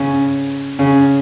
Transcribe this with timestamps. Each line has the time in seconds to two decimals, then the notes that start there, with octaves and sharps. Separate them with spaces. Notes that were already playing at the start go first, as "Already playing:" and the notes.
Already playing: C#3 C#4
0.79 C#3 C#4